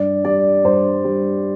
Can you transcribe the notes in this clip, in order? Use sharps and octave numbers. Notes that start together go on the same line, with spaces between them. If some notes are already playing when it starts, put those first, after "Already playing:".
Already playing: G2 D5
G3 D5
G2 C5
G3